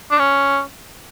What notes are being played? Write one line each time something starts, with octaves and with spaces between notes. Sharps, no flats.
D4
C#4